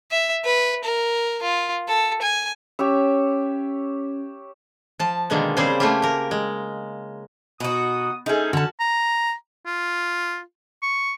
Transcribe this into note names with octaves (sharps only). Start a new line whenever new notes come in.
E5
B4
A#4
F4
A4
G#5
C#4 G4 C#5 E5
F3 A5
B2 D3 D#3 G#3 A#3
C#3 G3 C4 G4 G#4 C5
A3 A#3 C#4 F4 G4
G4 A#4
G#3
B2 D#4 F#4 D#6
A3 C#4 D#4 G#4 A4 C5
D3 C#4 F#4 A5
A#5
F4
C#6